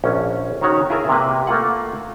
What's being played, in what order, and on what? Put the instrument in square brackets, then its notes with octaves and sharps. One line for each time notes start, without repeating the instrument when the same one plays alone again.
[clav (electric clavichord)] A#1 C#4
D#3 C#4 F#4 C#5 F#5
E4 F4 G#4 A#4 E5
C3 A#3 B4
A3 A#3 F4 F#5